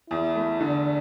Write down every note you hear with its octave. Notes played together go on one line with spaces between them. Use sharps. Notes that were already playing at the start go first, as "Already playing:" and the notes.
E2 E4
A3
D3 D4